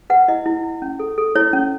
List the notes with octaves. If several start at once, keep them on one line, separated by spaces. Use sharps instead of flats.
B4 F#5
E4 D#5
E4
E4
C#4
A4
A4
E4 C#5
C#4